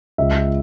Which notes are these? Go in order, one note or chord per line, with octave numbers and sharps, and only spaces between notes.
C#2 E5